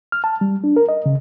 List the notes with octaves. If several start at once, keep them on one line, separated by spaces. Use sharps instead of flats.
F6
A5
G3
D4
A#4
D#5
C#3